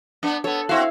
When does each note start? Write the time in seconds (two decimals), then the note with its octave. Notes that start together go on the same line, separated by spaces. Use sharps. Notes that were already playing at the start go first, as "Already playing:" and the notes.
0.23 B3 D4
0.44 B3 A4 C#5
0.69 C4 E4 F#4 F5